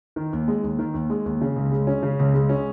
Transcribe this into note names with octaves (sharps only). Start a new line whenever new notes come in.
D#3
D#2
G#3
D#2
D#3
D#2
G#3
D#2
C#3
C#2
G#3
C#4
C#3
C#2
G#3
C#4